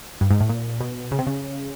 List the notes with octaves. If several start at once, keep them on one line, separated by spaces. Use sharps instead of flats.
G2
G#2
A2
A#2
B2
C#3
C3
C#3